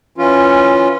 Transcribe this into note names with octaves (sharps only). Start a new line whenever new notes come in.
E3 C#4 F4